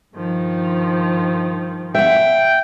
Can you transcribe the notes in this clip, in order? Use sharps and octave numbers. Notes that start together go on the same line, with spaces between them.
G2 D#3 F3
E5 F#5 G5